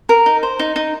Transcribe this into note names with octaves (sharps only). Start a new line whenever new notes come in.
A#4
D#4
C5
D#4
D#4